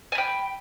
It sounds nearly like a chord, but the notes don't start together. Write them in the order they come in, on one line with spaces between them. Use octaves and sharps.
G#5 B5 G5